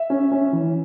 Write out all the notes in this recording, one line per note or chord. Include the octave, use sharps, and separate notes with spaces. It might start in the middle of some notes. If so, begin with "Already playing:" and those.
Already playing: E5
C#4
C#4
E3